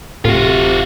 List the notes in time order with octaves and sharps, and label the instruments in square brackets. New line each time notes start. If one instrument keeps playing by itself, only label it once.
[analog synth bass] D1 [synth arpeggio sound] A2 [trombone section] C3 [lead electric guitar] F4 F#4